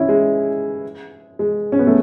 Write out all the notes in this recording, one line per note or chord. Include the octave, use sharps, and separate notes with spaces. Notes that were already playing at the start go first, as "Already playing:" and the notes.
Already playing: C#4 E4
G#3
G#3
C#4
B3
A3